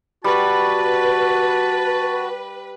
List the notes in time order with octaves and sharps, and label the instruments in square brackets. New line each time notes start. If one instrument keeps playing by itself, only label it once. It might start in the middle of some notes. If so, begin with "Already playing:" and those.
[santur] G3 [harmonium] F#4 [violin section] B4 [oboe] A5